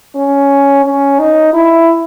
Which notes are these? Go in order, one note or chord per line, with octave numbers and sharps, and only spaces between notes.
C#4
C#4
D#4
E4